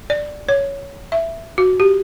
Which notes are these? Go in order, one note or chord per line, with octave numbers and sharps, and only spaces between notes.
D5
C#5
E5
F#4
G4